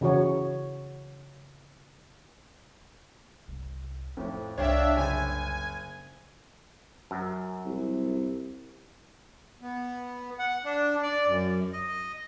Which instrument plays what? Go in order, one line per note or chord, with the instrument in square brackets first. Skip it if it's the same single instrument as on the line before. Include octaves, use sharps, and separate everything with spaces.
[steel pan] C#3 E3 F#4 C#5
[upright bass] G1 C2
[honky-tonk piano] F2 A2 [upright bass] D#3
[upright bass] C2 [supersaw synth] D4 E5 [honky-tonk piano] C#5 F5 G5
[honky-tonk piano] F#1 [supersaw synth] G#5
[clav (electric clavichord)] F#2
[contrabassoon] C2
[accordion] B3
F#5
D4
D5
F#2
D#5